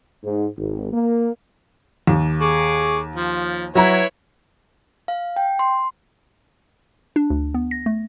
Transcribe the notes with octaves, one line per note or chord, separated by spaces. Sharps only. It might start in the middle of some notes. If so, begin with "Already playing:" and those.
G#2
G#1
A#3
D#2
G#4 C#6 D6
F3
F#3 E4 B4 C#5 A#5
F5
G5
C6
D4
D2
B3
A#6
A3